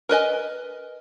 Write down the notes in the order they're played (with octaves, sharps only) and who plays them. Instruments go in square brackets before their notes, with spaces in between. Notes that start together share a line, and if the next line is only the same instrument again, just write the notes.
[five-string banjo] A#4 B4 D#5 G#5